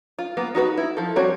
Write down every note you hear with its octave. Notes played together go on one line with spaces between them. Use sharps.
F4
A#3 B3
D#4 F#4 A#4 B4
E4
F3 A4
G3 C4 F#4 C#5